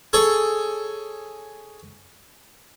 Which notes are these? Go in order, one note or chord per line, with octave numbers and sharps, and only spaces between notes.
G#4 A4 C#5